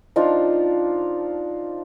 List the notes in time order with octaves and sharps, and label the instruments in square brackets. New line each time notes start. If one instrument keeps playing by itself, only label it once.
[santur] F3 D4 D#4 F4